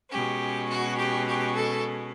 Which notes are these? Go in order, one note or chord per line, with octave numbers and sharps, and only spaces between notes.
B2 G#3 C#4 G4
F#4
G4
G4
A4